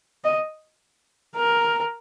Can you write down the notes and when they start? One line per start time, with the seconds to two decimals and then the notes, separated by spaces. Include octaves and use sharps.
0.24 D#5
1.37 A#4